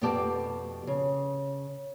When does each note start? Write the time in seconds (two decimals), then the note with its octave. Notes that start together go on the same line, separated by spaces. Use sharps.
0.01 F2 B2 B3 G4 D5 A5
0.87 C#3